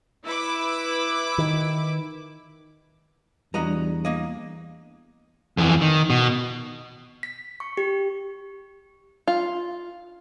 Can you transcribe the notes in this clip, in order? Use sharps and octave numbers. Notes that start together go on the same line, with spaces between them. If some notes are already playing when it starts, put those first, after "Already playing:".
E4 B4 D6
D#3
E2 G3 D4 F#4 D#5 A#5
A#3 D#5
F2 E3
D#3
B2
B6
C#6
G4
F4